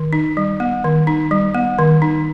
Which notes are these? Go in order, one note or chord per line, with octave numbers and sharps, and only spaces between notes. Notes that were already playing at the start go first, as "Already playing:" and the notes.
Already playing: D#3
D#4
G3
B3
D#3
D#4
G3
B3
D#3
D#4